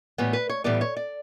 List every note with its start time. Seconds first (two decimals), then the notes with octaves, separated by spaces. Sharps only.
0.18 A2 E3 G3 B3
0.33 B4
0.49 C#5
0.64 A2 E3 G3 B3 D5
0.81 C#5
0.97 D5